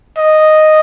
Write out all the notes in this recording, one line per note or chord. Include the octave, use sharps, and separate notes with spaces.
D#5